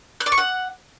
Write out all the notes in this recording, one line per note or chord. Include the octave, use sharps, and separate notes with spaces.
F#6
D5
C#6
F#5